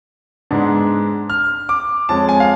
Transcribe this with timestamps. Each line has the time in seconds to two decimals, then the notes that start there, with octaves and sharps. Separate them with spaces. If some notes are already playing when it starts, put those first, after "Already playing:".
0.51 G#2 G#3 B3 D4
1.30 F6
1.69 D6
2.08 F2 F3 G#3 C#4 A5
2.29 G#5
2.40 F5